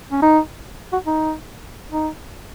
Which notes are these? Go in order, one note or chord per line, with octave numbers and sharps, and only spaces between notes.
C#4
D#4
F#4
D#4
D#4